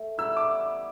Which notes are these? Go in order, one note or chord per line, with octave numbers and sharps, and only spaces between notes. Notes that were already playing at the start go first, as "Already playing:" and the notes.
Already playing: A3
E3 G3 B3 E4 E6
D6